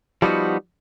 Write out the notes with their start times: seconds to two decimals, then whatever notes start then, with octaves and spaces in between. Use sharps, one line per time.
0.22 F3 G3 B3 D#4 F#4